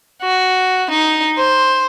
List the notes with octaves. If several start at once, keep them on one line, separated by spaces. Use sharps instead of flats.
F#4
D#4
C5